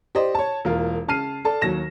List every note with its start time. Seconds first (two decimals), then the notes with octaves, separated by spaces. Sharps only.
0.15 G4 C5 D5 D#5
0.35 C#5 A5
0.65 E1 A#3 F4 A#4 F5
1.08 C#3 A5 F6 C7 D#7
1.45 A4 D5 A5
1.61 D#2 F#3 A#6 E7